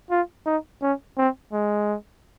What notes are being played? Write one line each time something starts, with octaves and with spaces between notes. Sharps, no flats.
F4
D#4
C#4
C4
G#3